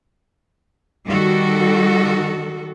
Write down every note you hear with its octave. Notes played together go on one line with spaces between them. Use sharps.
D#3 G3 F#4 A4